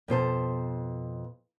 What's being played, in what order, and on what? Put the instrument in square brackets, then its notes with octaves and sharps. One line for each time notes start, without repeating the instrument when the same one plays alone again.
[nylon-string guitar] F2 B2 C5 A5